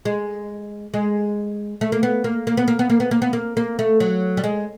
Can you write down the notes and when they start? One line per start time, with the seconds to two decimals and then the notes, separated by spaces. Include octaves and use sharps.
0.05 G#3
0.94 G#3
1.81 A3
1.92 A#3
2.03 B3
2.24 A#3
2.47 A#3
2.57 B3
2.68 A#3
2.79 B3
2.90 A#3
3.00 B3
3.11 A#3
3.22 B3
3.33 A#3
3.57 A#3
3.79 A3
4.00 F#3
4.37 G3
4.44 G#3